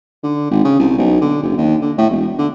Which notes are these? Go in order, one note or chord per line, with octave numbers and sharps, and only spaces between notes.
D3
G#1
C#3
C2
B1
D3
F#1
D#2
D3
A2
E1
D3